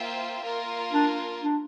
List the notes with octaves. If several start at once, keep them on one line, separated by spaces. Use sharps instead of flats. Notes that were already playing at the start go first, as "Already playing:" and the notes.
Already playing: A#3 F4 C5 E5 G5
A#3 F4 A#4
D4
D4